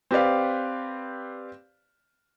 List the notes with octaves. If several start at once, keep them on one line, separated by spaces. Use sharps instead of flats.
C4 G4 B4 D5 F5